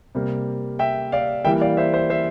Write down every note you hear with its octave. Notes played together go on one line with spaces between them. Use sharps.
C3 G3 A#3
E5 G5
D5 F5
E3 G3 A#3 E5 G5
D5 F5
C5 E5
C5 E5
C5 E5